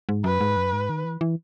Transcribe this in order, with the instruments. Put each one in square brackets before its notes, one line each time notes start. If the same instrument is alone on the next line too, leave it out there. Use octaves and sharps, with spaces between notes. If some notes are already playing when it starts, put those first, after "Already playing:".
[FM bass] G#2
[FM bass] F#2 [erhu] B4
[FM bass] G#2
F#2
G#2
D#3
E3
E3